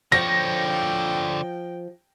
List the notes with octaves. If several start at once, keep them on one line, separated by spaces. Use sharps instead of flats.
D3 F3 C#5 G5 A#6